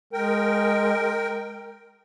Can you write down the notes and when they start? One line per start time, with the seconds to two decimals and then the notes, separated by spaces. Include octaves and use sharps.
0.13 G#3 A#4 G5